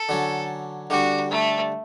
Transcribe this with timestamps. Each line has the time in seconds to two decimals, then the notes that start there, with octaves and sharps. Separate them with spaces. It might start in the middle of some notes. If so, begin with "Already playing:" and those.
Already playing: A4
0.09 D3 F#3 C#4
0.90 D3 G3 D4 F#4
1.30 A3